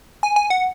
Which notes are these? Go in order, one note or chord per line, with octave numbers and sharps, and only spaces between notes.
G#5
G#5
F#5